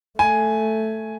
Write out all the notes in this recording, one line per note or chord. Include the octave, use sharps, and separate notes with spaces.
A3 G#5